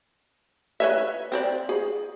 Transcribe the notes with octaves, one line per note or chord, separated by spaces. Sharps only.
B4 C#5 E5
C4 C5 D5
G#4